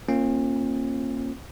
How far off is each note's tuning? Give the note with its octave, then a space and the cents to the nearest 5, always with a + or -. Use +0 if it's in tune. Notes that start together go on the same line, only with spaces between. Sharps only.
A#3 +0 C#4 -40 F4 +0